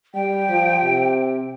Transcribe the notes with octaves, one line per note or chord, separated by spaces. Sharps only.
G3 G5
F3
C3